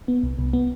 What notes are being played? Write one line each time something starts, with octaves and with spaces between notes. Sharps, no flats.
B3
C2
C2
B3